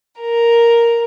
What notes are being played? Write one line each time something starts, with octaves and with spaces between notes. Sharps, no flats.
A#4